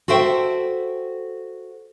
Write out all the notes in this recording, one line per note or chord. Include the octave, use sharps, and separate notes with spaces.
F#4 A4 C5 E5 G5